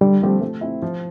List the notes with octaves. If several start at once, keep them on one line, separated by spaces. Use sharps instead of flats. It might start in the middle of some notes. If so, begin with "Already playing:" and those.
D3 G3
F3 A3 C4 G4
A3
C4 E4
F3